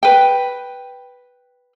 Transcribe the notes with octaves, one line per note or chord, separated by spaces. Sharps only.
B4 G5